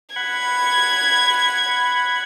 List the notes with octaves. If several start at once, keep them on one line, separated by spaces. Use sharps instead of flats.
F#5 B5 G#6